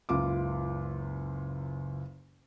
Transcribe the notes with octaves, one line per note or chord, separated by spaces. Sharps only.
F#1 C#2 F4 D6